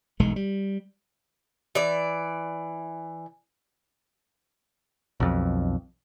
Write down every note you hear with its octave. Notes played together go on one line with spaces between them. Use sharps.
E1 B1 D#3 G#3
G3
E3 D5
B1 F2